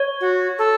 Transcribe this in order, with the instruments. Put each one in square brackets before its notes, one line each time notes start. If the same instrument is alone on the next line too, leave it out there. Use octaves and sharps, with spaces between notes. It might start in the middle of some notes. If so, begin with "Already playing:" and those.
Already playing: [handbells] C#5
[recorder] F#4
A4